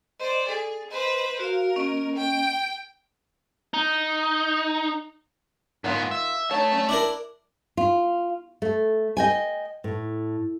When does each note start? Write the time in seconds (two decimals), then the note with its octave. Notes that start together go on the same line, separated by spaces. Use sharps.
0.20 C5 D5 D#5
0.48 G#4 A4
0.91 B4 C5 D#5
1.40 F#4 A#4 F5
1.76 A#3 C#4 D#5
2.16 G5
3.74 D#4
5.84 G#2 D#3 B3 F4
6.11 E5
6.51 A3 D#4 C#5 A5
6.72 G3 C#4
6.89 D4 E4 A#4
7.77 F4
8.62 A3
9.17 D#5 G5 G#5
9.84 A2